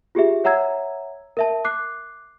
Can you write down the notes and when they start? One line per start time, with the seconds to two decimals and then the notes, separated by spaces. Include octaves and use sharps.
0.15 F4 G4 G#4 E5
0.44 C#5 E5 F#5 A#5 E6 G#6
1.37 A#4 E5 A5
1.65 D6 F#6 C7